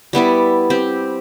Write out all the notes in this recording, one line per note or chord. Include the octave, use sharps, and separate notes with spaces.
G3 B3 E4 D5
C4 G4